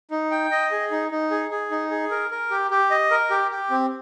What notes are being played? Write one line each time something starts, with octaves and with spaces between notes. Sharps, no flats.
D#4
G5
D#5
G#4
D#4
D#4
G#4
G#4
D#4
G#4
A#4
A#4
G4
G4
D#5
A#4
G4
G4
C4